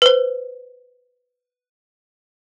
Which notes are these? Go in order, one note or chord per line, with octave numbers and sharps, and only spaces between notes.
B4 C5